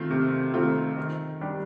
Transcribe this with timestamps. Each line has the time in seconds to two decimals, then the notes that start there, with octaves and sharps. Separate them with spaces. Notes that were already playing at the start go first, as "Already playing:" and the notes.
Already playing: D#3 A3 C4 F4
0.10 C3
0.54 D#3 A3 C4 F4
0.98 D#3
1.41 G3 D4 G4